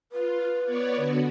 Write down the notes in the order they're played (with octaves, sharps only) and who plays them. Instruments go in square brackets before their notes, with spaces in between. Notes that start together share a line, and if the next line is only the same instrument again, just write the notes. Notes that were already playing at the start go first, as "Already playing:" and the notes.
[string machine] F4 [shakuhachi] B4
[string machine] B3 C#5 D5
D3 B3 F#4